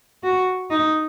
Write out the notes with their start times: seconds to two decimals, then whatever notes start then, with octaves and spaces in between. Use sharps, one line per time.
0.23 F#4
0.70 D#4